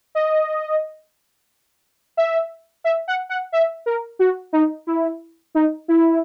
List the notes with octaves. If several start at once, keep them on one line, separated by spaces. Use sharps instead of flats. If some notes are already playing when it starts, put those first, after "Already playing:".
D#5
E5
E5
F#5
F#5
E5
A#4
F#4
D#4
E4
D#4
E4